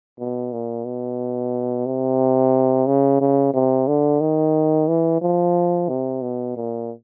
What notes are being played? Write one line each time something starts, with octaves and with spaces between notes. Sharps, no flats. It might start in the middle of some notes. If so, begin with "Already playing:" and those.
B2
A#2
B2
C3
C#3
C#3
C3
D3
D#3
E3
F3
C3
B2
A#2